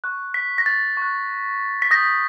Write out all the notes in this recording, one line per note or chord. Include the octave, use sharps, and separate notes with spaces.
C#6 F#6
B6
A#6
A6
C#6 F#6
B6
D#6 G6 A#6